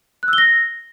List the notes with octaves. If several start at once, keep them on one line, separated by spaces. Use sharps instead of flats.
F#6
E6
G7
A#6